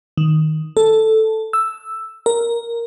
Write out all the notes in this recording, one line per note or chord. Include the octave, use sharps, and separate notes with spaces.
D#3
A4
E6
A#4